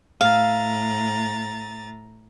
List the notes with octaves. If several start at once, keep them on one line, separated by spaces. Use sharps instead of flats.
A2 F5 A#5 A6